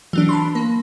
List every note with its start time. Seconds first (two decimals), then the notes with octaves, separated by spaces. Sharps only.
0.13 E3 F#3 D4
0.29 A5 B5 C6
0.55 A#3